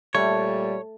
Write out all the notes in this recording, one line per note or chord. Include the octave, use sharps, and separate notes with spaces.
A#2 G3 A3 C#5